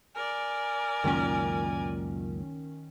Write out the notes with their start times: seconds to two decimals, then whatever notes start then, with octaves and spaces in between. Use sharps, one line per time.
0.15 A#4 D5 G#5
1.04 C#2 F#2 A#2 D#3 C#4